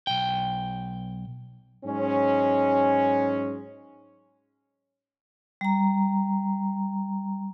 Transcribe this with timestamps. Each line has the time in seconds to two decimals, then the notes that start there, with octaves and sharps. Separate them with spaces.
0.07 B1 G5
1.85 G#2 F#3 G#3 C#4
5.61 G3 A#5